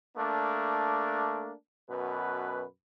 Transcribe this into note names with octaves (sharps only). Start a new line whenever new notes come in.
A3 A#3 D4
F#2 B2 B4